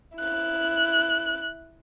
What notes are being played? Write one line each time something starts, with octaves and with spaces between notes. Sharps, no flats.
E4 F#6